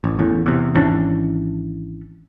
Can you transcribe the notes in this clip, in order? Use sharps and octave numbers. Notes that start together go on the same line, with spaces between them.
A1
A1 E2 A2
E2 C3
G#1 E3 C#4 D4